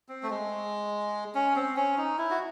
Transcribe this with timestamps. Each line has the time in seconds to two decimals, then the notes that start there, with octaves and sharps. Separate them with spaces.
0.09 C4
0.23 A3
0.30 G#3
1.35 C#4
1.56 C4
1.77 C#4
1.98 D#4
2.18 E4
2.30 F#4